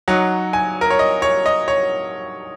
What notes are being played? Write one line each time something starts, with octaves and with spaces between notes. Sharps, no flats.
F#3 D#4 F#5
G#5
A#4
C#5
D#5
C#5
D#5
C#5